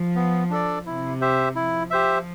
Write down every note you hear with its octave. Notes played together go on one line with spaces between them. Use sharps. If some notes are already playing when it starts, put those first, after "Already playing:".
Already playing: F3
B3
D4 A4 D5
C3 E4
G4 C5 E5
F3 E4
G4 C5 E5